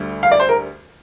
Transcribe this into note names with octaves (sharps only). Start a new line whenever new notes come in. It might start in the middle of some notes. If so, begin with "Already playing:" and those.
Already playing: D2 D3 G3
F5
D5
C5
A#4